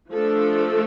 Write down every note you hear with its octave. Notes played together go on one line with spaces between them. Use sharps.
F3 A3 D4 A4